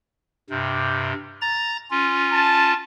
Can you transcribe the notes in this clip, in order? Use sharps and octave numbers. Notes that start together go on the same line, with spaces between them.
G2 C3
A#5 A6
C#4 F4
A5